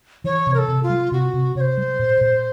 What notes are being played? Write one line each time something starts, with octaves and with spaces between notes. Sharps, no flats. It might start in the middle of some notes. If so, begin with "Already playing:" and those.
E3 C#5
C3
A#4
A4
C3
F4
G3
C3 F#4
C3
C3 C#5
C5
G3
A#2
A#2